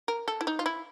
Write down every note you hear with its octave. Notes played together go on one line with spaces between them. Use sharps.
A#4
A4
E4
D#4
F4
E4